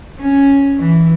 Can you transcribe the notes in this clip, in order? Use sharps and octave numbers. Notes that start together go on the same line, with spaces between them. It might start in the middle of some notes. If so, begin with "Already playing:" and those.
C#4
E3